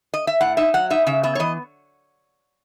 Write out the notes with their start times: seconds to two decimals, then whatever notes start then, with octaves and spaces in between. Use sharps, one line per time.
0.14 D#5
0.27 E5
0.41 A2 F#5
0.57 D#4 E5
0.74 F#3 F#5
0.90 D#4 E5
1.07 C#3 E5
1.23 B3 E5
1.35 C#5
1.40 E3 D#5